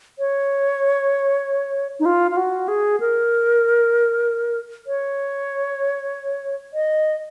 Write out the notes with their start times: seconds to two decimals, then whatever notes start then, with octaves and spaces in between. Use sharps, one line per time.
0.19 C#5
2.00 D#4
2.06 F4
2.31 F4
2.37 F#4
2.68 G#4
3.00 A#4
4.87 C#5
6.74 D#5